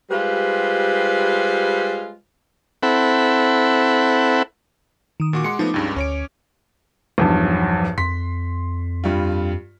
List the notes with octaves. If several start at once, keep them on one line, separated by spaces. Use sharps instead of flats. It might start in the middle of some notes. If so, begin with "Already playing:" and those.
G3 G#3 F4 G4 B4 C5
C4 E4 A4 F#5 B5
D#3 D#6
A#2 F#4 D6
G#3 F#5 C6 C#7
F3 A3 B3 D#4
C#2 G2 C#3
D2 C#4 C#5 D7
B1 E2 G2 F3
F2 C6 B6
G2 G3 F4